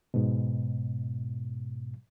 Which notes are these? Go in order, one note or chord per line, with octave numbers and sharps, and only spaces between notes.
G#2 B2